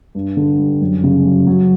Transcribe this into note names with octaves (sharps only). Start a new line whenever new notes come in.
G2
D3
G3
F#2
C#3
F#3
F#3